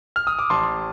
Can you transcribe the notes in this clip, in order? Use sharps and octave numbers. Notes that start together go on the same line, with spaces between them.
F6
D#6
D6
A1 A5 C6